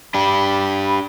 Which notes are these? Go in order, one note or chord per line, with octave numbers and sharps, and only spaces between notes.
D4 G4 B5